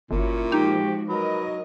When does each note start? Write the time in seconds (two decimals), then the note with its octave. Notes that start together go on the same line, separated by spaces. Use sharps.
0.11 G1 A#2 C#4 E4 F#4
0.52 F3 G#3 D#4 F#4 G4
1.09 F#3 A#4 B4 D#5